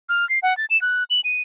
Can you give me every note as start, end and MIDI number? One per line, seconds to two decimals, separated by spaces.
0.09 0.27 89
0.29 0.39 96
0.43 0.56 78
0.57 0.65 93
0.70 0.80 100
0.81 1.04 90
1.10 1.21 102
1.24 1.42 99